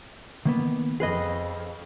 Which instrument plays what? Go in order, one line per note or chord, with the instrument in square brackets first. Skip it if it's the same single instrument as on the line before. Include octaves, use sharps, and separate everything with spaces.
[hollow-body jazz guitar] D#3 A#3 B3
[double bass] F2 [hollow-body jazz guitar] G#4 B4 D#5